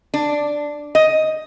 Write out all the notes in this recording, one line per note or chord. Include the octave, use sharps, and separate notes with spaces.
D4
D#5